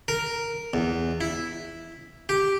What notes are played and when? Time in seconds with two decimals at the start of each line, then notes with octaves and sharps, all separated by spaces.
0.08 A#4
0.74 E2
1.21 E4
2.29 G4